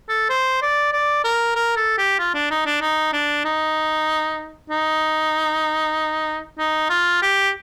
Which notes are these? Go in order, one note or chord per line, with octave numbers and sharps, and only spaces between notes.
A4
C5
D5
D5
A#4
A#4
A4
G4
F4
D4
D#4
D4
D#4
D4
D#4
D#4
D#4
F4
G4